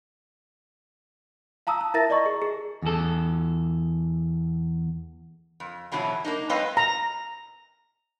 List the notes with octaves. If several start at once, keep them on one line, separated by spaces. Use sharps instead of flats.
F5 A5 A#5 D#6 E6
A5
E4 A#4 E5 A5 A6 A#6
D5 D#5 A#5 C#6
G#4
G#4
E2 A4
F2
F2 B2 E3 F#3 E4
A#3 D4 D#4
F#3 G#3 C4 B4 D#5 F5
A#5